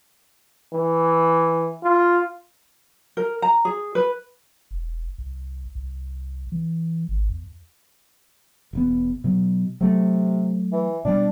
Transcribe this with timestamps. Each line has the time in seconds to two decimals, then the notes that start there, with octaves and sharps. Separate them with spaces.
0.73 E3
1.83 F4
3.17 A#4
3.42 A#5
3.65 G#4
3.95 B4
4.71 E1
5.18 C2
5.75 C2
6.52 E3
7.09 G#1
7.29 E2
8.73 E1 E2 B3
9.24 B2 F#3
9.81 C3 F#3 A3
10.72 E3
11.05 B2 G3 D4